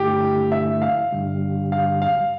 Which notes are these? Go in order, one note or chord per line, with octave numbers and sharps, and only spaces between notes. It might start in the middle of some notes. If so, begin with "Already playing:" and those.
Already playing: G2 D3 A3 E4 G4
E5
F5
G2 D3 G3
F5
F5